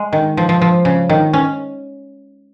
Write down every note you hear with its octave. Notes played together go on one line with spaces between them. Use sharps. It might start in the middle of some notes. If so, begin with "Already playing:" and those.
Already playing: G#3
D#3
F3
F3
F3
C#3
D#3
C#4